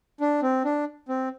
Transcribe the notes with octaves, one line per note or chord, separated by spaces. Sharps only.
D4
C4
D4
C4